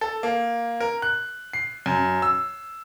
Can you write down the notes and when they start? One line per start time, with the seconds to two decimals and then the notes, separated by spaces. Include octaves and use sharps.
0.01 A4
0.23 A#3
0.80 A#4
1.02 F#6
1.53 C7
1.86 F#2
2.22 E6